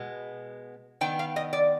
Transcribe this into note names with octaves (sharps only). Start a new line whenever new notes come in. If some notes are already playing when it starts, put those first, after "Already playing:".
Already playing: B2 G#3 B3
D#3 B3 G5
F5
D#5
D5